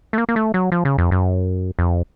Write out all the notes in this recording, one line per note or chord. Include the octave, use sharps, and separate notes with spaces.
A3
A#3
A#3
A3
F#3
F3
C#3
F2
F#2
F2